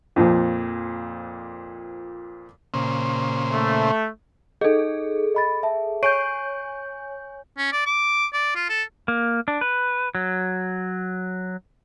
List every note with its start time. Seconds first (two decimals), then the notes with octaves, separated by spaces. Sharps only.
0.16 F2 A#2 F3
2.74 A#2 C#3 C5
3.53 A3
4.61 D#4 G#4 A4 D#5
5.35 D#5 B5 A6
5.63 E5 A5
6.03 C#5 G#5 C#6 G6 D7 D#7
7.58 C#4
7.72 D5
7.86 D6
8.33 D5
8.55 F4
8.69 A4
9.08 A#3
9.48 D4
9.61 B4
10.15 F#3